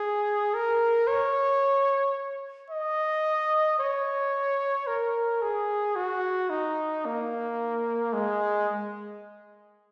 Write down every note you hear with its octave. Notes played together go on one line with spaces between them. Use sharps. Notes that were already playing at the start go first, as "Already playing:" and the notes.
Already playing: G#4
A#4
C#5
D#5
C#5
A#4
G#4
F#4
D#4
A#3
G#3